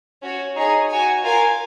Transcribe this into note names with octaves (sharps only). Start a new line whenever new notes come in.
C#4 F#4 C#5
D#4 G#4 C#5
F#4 C#5 G#5
F4 A#4 F5 G#5